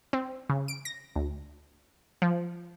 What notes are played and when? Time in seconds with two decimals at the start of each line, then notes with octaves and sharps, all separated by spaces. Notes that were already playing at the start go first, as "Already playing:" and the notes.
0.13 C4
0.50 C#3
0.68 D7
0.85 A#6
1.16 D2
2.22 F3